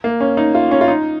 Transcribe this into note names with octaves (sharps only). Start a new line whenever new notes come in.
A#3
C#4
D#4
F4
C#4
F4
D#4